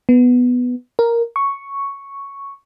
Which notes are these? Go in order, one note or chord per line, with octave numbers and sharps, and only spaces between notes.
B3
A#4
C#6